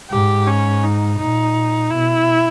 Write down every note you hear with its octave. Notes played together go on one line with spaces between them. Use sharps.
G#2 G4
C#4
D#4
A#2 D#4
B2 E4